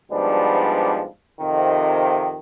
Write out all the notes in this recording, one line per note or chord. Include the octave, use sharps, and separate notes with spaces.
G#2 B2 F3 G3 B3 D4
F2 C3 D#3